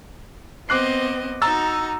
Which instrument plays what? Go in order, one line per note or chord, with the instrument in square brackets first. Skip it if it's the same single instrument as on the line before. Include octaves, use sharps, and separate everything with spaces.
[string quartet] B3 C4 D#5 [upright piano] D6 F#6 C7
[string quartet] D#4 F#4 [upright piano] A#5 E6 A6